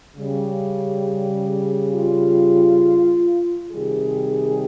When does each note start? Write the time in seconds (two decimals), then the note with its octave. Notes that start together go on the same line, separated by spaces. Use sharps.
0.17 C#3 G3
1.94 F4
3.71 C3 D#3 G3 G#4